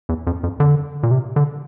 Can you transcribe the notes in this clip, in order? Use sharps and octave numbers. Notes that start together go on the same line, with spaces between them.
E2
F2
F2
D3
A#2
C3
D3